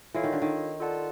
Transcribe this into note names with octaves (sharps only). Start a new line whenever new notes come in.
E3 F4 A4 C#5 F5
D#3
D3
D#3
F4 A4 D5 F#5 A5